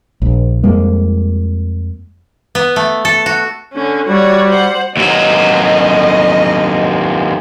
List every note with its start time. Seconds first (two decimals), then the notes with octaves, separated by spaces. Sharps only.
0.22 A#1
0.63 F2 G3 G#3 A#3
2.55 B3
2.76 A3
3.05 A4
3.26 F#4
3.73 D3 C#4
4.08 G3 F#4 C#5 D5
4.49 C5 F#5
4.97 D#2 F#3 D#5